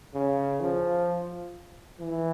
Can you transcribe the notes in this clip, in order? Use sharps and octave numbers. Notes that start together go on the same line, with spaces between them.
C#3
F3
E3